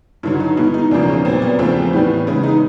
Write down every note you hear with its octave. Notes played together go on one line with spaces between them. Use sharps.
G2 D3 F#3 E4
D#4
B2 G#3 B3 E4
D#4
E2 C#3 F3 A#3 D4
C#4
A#2 F#3 B3 C4
B3
E2 C#3 F3 A3 C4
A2 E3 G3 B3
C#3 E3 G#3 B3 E4
D#4